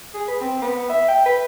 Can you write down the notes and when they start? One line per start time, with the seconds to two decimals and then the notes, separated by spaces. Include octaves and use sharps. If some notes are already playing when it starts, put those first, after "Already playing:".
0.14 G#4
0.28 B4
0.41 C4
0.62 B3
0.89 E5
1.08 G5
1.25 B4